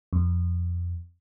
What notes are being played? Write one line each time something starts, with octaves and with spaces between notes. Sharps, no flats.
F2